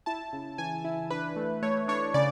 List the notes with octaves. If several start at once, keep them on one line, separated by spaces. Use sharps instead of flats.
E4 A5
C#3
E3 G#5
E4
D4 B4
A3
A3 C#5
D4 C#5
C#3 D5